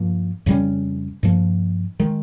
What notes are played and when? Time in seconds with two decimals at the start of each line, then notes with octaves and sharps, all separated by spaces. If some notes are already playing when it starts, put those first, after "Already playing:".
Already playing: G2 F3 A#3
0.46 F2 C#3 G3 C#4
1.23 G2 F3 A#3
2.00 D#3 G#3